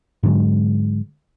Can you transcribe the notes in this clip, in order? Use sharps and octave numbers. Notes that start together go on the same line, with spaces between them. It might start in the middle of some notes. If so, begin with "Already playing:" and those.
G#2 D3 F#3 G#3